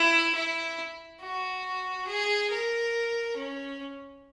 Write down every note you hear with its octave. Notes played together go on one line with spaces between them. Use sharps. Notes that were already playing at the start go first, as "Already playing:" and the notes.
Already playing: E4
E4
F#4
G#4
A#4
C#4